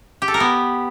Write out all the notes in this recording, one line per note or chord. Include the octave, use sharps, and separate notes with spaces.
G4
A4
A#4
B3